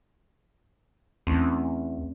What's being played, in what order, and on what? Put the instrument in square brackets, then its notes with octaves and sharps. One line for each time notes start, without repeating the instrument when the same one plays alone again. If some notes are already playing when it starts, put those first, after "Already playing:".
[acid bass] E2 [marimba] A3 C4 C#4